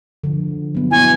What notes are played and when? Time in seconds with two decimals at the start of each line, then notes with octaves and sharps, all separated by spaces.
0.24 D3 F3
0.75 F#3 B3
0.91 B3 E4 G#5